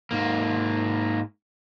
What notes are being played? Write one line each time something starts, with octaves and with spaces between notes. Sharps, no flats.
G#2 A#3